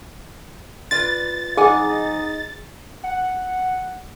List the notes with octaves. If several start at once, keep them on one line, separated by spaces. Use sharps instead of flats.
F4 B4 D5 A6
F2 D#4 G#4 F#5 G#5
F#5